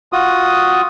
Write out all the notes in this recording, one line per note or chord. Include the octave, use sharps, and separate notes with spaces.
F4 F#4 D#6